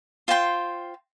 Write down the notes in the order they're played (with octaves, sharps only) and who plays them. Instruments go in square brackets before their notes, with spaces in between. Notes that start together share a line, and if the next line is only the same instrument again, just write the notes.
[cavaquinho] F4 C5 G5 C6